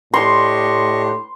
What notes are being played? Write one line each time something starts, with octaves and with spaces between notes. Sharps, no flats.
A2 D4 G4 D#5 C6 C#6